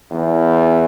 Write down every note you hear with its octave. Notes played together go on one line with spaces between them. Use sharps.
E2